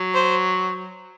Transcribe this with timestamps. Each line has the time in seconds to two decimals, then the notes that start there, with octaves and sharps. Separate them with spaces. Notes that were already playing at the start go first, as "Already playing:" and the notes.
Already playing: F#3
0.14 C5